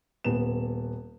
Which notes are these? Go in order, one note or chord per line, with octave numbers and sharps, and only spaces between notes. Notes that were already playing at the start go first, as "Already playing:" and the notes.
D#1 B3 E7